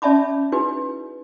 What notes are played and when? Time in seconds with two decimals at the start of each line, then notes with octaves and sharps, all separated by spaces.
0.02 C#4 D5 E5 A5 B5 D6
0.52 D#4 E4 F#4 G#4 B4